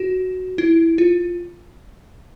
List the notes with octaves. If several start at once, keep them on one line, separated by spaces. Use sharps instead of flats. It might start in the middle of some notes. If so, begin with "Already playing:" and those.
Already playing: F#4
E4
F4